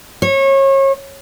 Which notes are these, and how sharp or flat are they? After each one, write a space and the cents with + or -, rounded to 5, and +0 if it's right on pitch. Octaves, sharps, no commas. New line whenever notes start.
C#5 -30